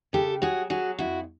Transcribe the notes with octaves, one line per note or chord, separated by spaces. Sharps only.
C#3 G4 A4
F#3 F#4 G#4
F#3 F#4 G#4
F2 E4 F#4